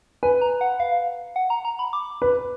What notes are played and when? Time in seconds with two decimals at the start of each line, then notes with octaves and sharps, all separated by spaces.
0.23 B4 G#5
0.41 A#5
0.61 F#5
0.80 F5
1.36 F#5
1.50 A#5
1.65 A#5
1.79 B5
1.93 D6
2.22 B4